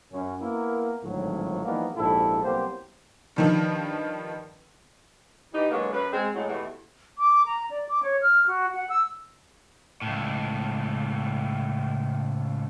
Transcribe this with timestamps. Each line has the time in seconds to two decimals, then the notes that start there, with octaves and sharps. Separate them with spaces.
0.13 F#2 C#4
0.41 A#3 B3 E4 A#4
1.03 G#1 D2 A2 F3 F#3
1.65 E3 F3 G3 A#3 B3 D#4
1.96 A#1 G#2 E4 G4 A4
2.43 C2 F#3 A#3 B3 G4 C5
3.36 G2 D#3 F3
5.53 E3 D#4 G4
5.71 D3 F#3 G#3 A#3 B3
5.93 F#2 B4
6.12 G#3 C4
6.35 A2 F#3 G#3
6.48 E2 B2 E3 A3 B3 G4
7.18 D6
7.46 A#5
7.71 D5
7.89 D6
8.02 C#5
8.22 F6
8.47 F#4
8.75 F#5
8.89 E6
10.02 C#2 A2